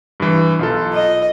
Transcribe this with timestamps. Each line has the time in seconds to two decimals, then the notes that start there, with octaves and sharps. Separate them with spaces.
0.20 G2 E3
0.59 B1 F4 A4
0.94 D#5